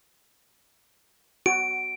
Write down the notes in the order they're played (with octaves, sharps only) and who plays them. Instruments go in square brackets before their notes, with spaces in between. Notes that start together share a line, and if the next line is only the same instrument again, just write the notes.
[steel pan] F#4 [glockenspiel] D7